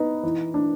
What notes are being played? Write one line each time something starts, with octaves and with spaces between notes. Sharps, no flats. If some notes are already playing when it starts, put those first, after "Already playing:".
Already playing: B3 D#4
E3
D4